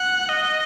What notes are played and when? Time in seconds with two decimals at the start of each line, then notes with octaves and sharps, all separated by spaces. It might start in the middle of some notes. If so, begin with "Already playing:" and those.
Already playing: F#5
0.29 D#5